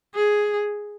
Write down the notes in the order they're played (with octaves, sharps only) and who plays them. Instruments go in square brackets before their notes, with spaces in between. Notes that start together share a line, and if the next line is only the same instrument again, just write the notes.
[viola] G#4